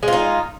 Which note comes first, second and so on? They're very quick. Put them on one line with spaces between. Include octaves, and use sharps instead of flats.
G#3 F4 D#4